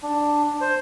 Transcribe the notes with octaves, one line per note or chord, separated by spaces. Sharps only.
D4
C5